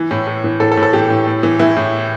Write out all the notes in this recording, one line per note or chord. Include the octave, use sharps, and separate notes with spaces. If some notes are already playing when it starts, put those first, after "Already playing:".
Already playing: E3
A2
A2
E3
A2 A4
A4
A2
A4
E3 G4
A2
A2
E3
E3 E4
A2